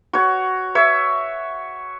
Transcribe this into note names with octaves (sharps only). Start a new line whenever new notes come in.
F#4 C#5
C#5 E5